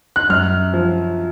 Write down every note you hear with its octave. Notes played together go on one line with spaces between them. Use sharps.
F#6
F#2 F6
F3